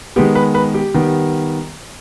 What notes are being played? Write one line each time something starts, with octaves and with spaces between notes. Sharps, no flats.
D#3 G#3 B3 G4
B4
B4
G4
D#3 G3 B3